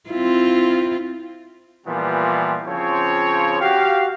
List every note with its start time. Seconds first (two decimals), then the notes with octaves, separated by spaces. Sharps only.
0.10 C4 E4 F4
1.86 A#2 E3 F3 G3 B3
2.66 C#3 F3 C4 C#5
3.60 F#4 G4 F5